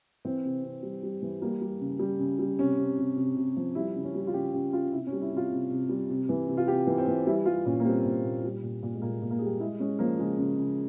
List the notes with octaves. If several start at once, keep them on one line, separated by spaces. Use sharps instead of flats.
E3 C4
C3
C3
G3
G3
E3
G3 A#3
G3
C#3
G3
C#3
G3
C3 C#4
C3
C3
C3
C3
F3
G3 E4
C#3
C#4
G3
F4
C#3 G4
C#3 G4
C#3 F4
C3 E4
C#4
G3
E4
C3
F4
C3
C3
G3
C3
E3
C3
F4
C3 G4
E3
C4
E3
G3 E4
G3 F4
A#2 C#4
A#3
G3 C4
A#2
A#2
G3
A#2
A#2
G#3
A#2 A#3
A#2
A#3
G#4
G3 G4
G#3 E4
G#3 C#4
F3 A#3
C#3 G#3
C#3
C#3